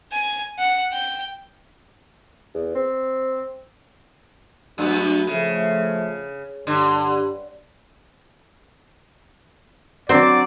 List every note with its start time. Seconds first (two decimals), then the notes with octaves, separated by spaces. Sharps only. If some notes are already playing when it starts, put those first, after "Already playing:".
0.12 G#5
0.58 F#5
0.92 G5
2.54 E2
2.75 C4
4.78 G2 F#3 A3 B3
5.27 C#3 F3 A3
6.67 G2 D3
10.09 F#3 C4 D4 D5 D6